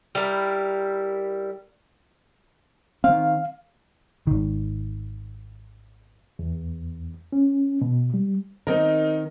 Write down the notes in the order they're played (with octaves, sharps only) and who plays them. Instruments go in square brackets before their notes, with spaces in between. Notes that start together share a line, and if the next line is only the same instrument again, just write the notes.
[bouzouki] G3 E4 A#4
[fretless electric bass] D#3 C4 [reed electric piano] F5
[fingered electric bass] G#1 D#3
[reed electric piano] E2
C#4
B2
G3
[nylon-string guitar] D#3 C4 [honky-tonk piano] D#4 A#4